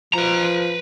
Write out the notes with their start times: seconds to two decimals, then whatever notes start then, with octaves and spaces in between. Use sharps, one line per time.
0.14 F3 B4 A#5